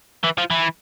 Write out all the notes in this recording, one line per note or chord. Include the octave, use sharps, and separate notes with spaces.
E3
F3
E3